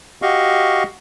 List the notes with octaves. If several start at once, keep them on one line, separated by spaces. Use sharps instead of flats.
F#4 G4 D#5 F5 C#6